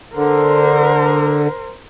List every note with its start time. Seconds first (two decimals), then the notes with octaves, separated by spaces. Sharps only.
0.16 D3 A#4 C5